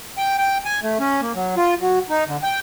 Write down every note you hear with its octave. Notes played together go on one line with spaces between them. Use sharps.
G5
G5
G#5
A3
C#4
A#3
F#3
F4
F#3
D#4
D3
G5